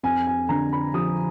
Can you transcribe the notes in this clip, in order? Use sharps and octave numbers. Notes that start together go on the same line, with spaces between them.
F2 G#5
G#5
D3 A#5
B5
F3 D#6